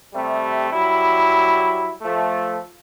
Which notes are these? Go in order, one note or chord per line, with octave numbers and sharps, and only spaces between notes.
C3 G3 A3
F#3 G3 E4
F3 A3